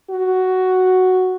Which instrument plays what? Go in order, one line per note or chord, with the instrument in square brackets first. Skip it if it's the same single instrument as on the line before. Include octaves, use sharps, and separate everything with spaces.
[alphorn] F#4